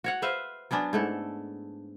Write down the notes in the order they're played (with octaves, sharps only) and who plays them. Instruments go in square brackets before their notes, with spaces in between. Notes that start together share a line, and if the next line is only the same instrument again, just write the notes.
[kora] F#4 C#5 F#5
B4 C5 E5 F5
F#3 B3 C#4 D4
G#2 A3 E4